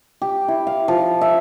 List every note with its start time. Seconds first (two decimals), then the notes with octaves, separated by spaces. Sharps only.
0.22 G4
0.48 E4
0.67 F5
0.88 F3
1.21 E5